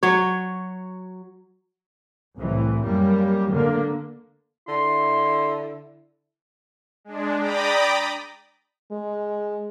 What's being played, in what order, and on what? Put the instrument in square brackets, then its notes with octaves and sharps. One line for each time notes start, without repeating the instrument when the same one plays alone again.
[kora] F#3 C#5
[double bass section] C2 A2 E3
F#2 G3 A#3
D3 A#3
[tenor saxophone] D3 [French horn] E4 [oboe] C6
[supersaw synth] G#3 D4
D5 G5 A#5 B5 D6 D#6
[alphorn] G#3